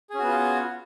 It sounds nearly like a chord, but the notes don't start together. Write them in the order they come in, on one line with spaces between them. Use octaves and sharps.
G#4 C#4 F#4 B3 F4